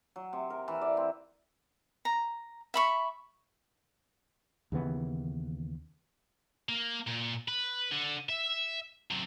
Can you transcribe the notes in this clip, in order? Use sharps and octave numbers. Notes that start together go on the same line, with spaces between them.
F#3
C3
A#4
E3
D5
C4
A#5
E5 B5 C#6
D#2 C#3 E3 B3
A#3
A#2
B4
D3
E5
F#3 C4